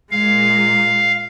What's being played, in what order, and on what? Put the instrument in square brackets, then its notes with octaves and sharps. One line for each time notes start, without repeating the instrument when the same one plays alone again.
[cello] A#2 G#3 [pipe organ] F5